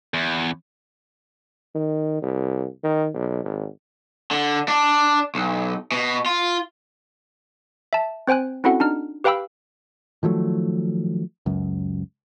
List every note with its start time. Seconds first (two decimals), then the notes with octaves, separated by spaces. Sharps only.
0.14 E2
1.75 D#3
2.22 C2
2.84 D#3
3.14 B1
3.44 G#1
4.31 D3
4.68 D4
5.35 B1
5.92 B2
6.26 F4
7.93 E5 A5
8.27 C4 C5 G5 G#5 F#6
8.64 C4 C#4 E4 F#4 A4 F#5
8.80 D4 D#4 F6
9.24 G4 B4 F5 G5 B5 E6
10.23 D#3 F3 F#3 A3
11.46 C#2 F#2